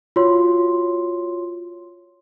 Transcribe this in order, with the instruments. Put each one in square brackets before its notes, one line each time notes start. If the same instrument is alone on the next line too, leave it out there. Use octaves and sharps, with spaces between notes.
[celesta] F4 F#4 C#5 C6